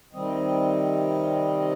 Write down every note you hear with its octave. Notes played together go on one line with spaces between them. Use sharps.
C3 D#3 G3 C4 D#5